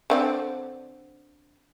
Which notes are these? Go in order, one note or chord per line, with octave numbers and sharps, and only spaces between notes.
D3 C4 D5